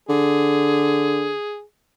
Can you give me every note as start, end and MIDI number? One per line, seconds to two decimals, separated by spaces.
0.09 1.32 50
0.09 1.62 68